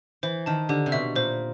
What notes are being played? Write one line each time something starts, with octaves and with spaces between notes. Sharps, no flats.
E3 C5
D#3 A5
D3 G4
C3
B2 E5
A#2 C5